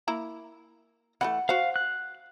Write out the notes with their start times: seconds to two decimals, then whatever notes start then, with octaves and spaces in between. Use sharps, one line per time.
0.08 A#3 E4 A#5
1.21 E3 F3 A3 F#5
1.49 F#4 C5 F5
1.76 F#6